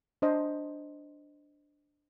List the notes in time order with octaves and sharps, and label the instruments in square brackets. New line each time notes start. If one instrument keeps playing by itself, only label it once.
[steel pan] D4 C5 D#5